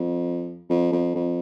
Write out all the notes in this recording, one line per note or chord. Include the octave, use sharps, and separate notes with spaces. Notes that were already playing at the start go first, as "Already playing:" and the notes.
Already playing: F2
F2
F2
F2